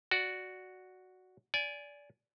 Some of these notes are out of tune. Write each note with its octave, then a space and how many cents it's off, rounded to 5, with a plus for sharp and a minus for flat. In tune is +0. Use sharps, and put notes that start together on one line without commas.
F#4 +0 D5 +0
D5 -20 G#5 +0